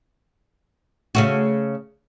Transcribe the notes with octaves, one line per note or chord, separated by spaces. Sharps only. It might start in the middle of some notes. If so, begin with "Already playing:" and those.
C#3 A3 F#4